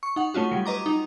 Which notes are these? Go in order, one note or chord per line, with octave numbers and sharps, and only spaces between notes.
C#6
D#4 F#5
A3 C#4 F4 F#4
F#3 G3
B4 D#5 A#5 D6
D#4